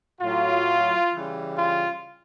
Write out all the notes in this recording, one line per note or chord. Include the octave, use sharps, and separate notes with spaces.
A2 F#3 F4
C#3 E3 G3
F4